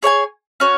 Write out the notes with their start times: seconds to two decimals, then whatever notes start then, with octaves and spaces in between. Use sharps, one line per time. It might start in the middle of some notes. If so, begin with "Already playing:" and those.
0.03 G#4 C#5 E5 G#5
0.60 C#4 F#4 C#5